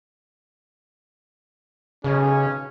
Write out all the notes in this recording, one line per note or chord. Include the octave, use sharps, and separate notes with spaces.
B1 C#3 C#4 G#4